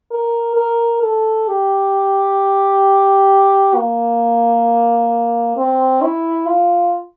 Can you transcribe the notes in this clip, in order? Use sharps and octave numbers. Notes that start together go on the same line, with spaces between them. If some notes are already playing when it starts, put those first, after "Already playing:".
A#4
A#4
A4
G4
A#3
C4
E4
F4